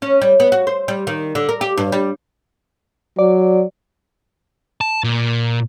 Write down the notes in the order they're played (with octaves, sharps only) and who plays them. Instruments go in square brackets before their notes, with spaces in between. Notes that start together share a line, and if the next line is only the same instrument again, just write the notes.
[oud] C#4
G3
B3
F#4
C5
G3
D#3
D3
A#4
G4
G2
G3
[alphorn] F#3 [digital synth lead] D5
[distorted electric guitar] A5
A#2